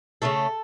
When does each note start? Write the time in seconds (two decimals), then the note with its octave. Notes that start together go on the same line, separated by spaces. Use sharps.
0.22 C#3 E3 A3 A4